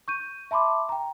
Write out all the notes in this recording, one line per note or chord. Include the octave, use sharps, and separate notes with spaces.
C#6 G6 D#7
E5 A5 B5 C6 D6
G5 A#5